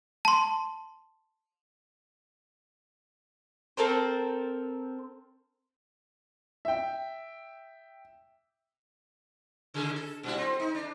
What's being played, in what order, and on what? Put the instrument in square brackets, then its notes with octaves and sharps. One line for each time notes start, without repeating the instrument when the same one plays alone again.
[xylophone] A5 C6
[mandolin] C4 A4 A#4 C5
[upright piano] E5 G5
[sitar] C#3 G#4 A4
A4
A#2 G3 E4
C4
D#4
D4